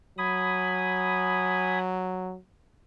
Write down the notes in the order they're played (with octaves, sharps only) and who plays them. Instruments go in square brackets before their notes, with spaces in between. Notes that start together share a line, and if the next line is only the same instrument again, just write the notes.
[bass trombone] F#3 [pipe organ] G#5 B5 D#6